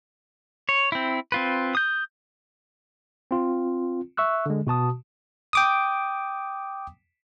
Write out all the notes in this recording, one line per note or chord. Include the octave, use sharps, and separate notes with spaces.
C#5
C4 E4
C4 F4 B4
D#6 G6
C4 F4
E5 C#6 E6 F#6
D3 G#3
B2 F#4 A5 D#6
G5 D6 D#6